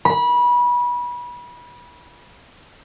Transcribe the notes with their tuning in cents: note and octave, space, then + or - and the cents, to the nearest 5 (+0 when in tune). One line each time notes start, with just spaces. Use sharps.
B5 -25